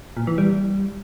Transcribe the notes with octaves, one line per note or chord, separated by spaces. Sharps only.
A#2
E3
G3